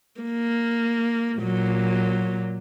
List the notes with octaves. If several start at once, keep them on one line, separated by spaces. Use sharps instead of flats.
A#3
A#2 F#3